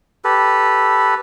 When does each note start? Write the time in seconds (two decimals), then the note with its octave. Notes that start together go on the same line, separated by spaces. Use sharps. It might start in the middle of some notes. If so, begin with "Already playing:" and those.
0.24 G4 A4 B4